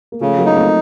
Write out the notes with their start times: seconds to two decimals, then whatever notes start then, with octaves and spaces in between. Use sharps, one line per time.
0.12 A#3
0.21 C#3 F3 A3
0.39 F#3 A#3
0.45 D#4
0.56 A3 C4